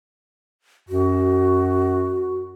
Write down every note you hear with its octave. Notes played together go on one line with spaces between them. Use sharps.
F#2 F#4